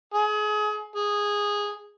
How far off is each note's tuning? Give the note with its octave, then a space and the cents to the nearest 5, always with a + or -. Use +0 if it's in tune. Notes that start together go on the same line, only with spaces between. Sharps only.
G#4 +30
G#4 -10